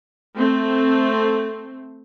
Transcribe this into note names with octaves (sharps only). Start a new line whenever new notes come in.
A3 C4